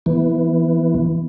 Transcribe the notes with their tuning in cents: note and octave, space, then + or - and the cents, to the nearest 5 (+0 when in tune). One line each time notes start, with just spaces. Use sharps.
E3 +0 B3 +0